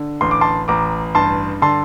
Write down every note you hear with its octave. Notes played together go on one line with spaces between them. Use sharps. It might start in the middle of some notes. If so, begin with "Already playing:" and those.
Already playing: D3
A1 C6
D6
A5 C6
A1 A#5 D6
G2 A5 C6
D3 A5 C6